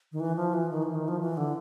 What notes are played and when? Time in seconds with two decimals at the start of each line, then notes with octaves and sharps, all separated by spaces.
0.12 D#3
0.20 E3
0.36 F3
0.53 E3
0.70 D#3
0.83 E3
0.95 D#3
1.08 F3
1.21 E3
1.37 D3